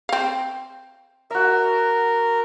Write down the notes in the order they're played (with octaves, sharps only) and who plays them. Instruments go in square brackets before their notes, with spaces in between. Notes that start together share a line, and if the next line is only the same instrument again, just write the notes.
[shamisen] C4 F5
[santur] F#4 E5 [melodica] A#4